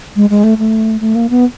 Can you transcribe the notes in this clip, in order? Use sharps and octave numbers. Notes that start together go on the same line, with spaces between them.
G#3
G#3
A3
A3
A3
A#3
B3